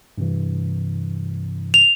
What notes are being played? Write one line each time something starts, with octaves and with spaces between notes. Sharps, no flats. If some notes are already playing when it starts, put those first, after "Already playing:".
G2 C3 E3
F7